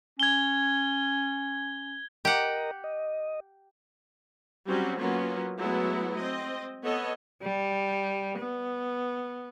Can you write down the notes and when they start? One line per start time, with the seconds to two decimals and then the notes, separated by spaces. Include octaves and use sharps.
0.20 C#4 G#6 G7
2.25 G4 A#4 D#5 F#5 A#5
2.84 D#5
4.67 F#3 G3 C4 C#4 F#4
4.99 F#3 A#3 B3 C#4 F4
5.58 F#3 G#3 A3 B3 E4 F#4
6.17 C4 D#5
6.84 B3 A4 C#5 D#5
7.43 G3
8.38 B3